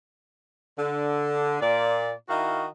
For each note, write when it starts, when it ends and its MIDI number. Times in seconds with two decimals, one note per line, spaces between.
0.79 1.57 50
1.62 2.14 46
1.62 2.14 74
2.29 2.67 51
2.29 2.67 64
2.29 2.67 66
2.29 2.67 75
2.29 2.67 77